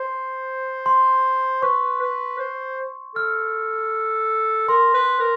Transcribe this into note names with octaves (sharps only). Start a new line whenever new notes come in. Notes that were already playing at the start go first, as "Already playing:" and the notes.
Already playing: C5 C6
C6
B4 C#6
B4
C5
A4 F6
A#4 C6
B4
A#4